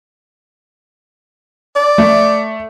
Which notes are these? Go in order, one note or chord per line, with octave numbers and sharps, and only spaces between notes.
D5
A3